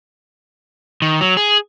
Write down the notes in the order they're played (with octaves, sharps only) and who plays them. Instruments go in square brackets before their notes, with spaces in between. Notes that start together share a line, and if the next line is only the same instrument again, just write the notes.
[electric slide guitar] D#3
F#3
G#4